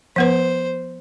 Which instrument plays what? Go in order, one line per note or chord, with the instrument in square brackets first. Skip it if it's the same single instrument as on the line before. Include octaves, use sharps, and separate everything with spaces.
[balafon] F3 B3 B4 [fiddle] C5